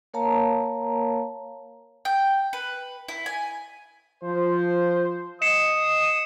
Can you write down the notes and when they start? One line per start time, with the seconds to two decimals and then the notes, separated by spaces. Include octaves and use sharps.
0.14 A#3 A#4 C#5 F5 A5 A#5
2.05 G5
2.53 B4
3.09 E4
3.26 G#5
4.23 F3 C5
5.42 D#5 D#6 C7 C#7 E7